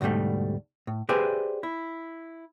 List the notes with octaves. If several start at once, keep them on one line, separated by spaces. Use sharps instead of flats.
D2 G#2 B2 G3 A3
A2
G4 G#4 B4 C5 D5 E5
E4